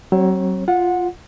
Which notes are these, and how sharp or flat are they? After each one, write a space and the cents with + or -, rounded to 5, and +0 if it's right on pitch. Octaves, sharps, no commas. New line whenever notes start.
F#3 +30 C4 +30 C#5 -35
F4 +0 F#5 -20